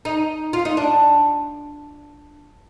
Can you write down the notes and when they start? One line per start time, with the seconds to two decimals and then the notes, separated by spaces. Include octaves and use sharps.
0.05 D#4
0.53 F4
0.65 D#4
0.77 D4